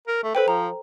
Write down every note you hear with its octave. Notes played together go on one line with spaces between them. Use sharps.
A#4
A3
A4 B4 C5 G5
F3 A#5